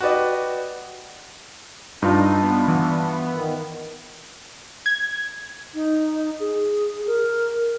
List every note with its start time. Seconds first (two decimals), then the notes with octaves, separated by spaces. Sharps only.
0.01 F#4 G4 B4 D5 D#5
2.02 G2 D4 D#4 F4
2.43 B3
2.68 E3
3.31 D#3
4.86 G#6
5.74 D#4
6.40 G#4
7.07 A#4